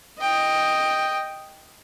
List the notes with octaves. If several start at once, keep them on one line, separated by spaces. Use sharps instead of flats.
D#5 G5